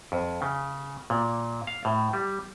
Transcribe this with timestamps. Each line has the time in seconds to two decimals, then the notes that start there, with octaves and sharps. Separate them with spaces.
0.12 F2
0.42 C#3
1.10 A#2
1.67 F5
1.85 A2
2.13 G3